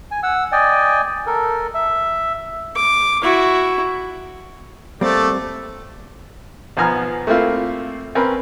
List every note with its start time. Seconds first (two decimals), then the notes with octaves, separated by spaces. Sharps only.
0.11 G#5
0.23 F#5 E6
0.52 D5 D#5 G5 G#5
1.27 A4 A#4
1.74 E5
2.75 D6
3.22 E4 F#4
5.01 G3 A3 A#3 C4 D5
6.77 B1 F3 B3 G#5 A#5 F6
7.27 A3 A#3 C4 E4 F4
8.15 C4 C#4 A#4 B4